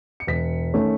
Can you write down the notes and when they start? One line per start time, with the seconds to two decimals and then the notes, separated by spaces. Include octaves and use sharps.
0.20 C#7
0.27 E1 B6
0.74 D#3 A3 C#4